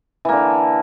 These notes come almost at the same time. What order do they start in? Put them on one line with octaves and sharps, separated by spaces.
E3 A#3 D3